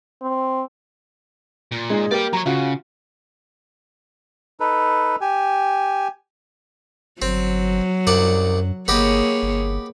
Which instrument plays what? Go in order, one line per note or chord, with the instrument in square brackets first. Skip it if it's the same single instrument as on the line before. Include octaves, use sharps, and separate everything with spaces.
[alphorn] C4
[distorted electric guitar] A#2
[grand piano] G#3 D#4 G#4
[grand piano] A#3 G4 A#4 [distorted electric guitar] D5 G5
[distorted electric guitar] F#3 C#5 [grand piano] A#5
[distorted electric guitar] C#3 [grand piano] F4 F#4
[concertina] D#4 A4 B4
G4 G#5
[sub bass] G1 [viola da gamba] F#3 [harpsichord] C4
[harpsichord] C2 D5 F#5 [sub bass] F#2
[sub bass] G1 [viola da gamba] A#3 G#4 C#5 [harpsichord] B3 G4 D#5
[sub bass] G1